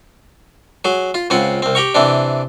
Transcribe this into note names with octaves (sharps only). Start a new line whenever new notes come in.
F#3 G#4
F4
C#2 C#3 C4 F4 F#5
C2 C4
G4 G5 A#5 C#6
C3 E3 C4 D4